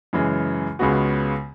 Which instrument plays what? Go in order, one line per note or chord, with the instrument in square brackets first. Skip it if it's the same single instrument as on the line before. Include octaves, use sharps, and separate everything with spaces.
[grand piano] F#2 C#3 E3 G#3
C#2 C#3 G#3 B3 F#4